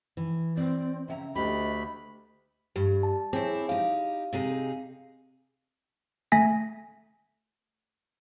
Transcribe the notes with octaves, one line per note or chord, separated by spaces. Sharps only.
E3
C4 D5
C#3 E5 F#5 A#5
D2 G4 D#5 B5
G2 G4
A5
C4 E4 G#4 C#5
D#4 G4 F5
C3 D#4 G#4
A3 G#5 A#6 B6